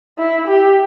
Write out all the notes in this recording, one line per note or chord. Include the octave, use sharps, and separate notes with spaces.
E4
G4